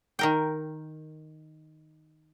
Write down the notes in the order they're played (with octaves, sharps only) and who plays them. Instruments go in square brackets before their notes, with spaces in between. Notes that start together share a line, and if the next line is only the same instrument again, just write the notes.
[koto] D#3 A#4 G5